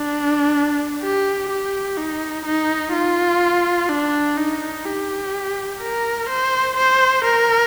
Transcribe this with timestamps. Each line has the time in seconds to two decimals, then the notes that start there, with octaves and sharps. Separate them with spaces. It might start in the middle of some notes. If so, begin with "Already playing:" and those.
Already playing: D4
1.02 G4
1.50 G4
1.97 D#4
2.46 D#4
2.93 F4
3.89 D4
4.37 D#4
4.85 G4
5.81 A#4
6.30 C5
6.77 C5
7.25 A#4